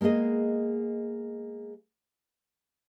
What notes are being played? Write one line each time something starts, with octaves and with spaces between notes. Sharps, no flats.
G#3 A#3 B3 G#4 D#5